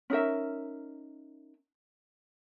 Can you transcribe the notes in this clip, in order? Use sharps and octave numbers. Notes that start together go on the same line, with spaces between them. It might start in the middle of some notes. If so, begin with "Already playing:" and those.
C#4 D#4 A#4 E5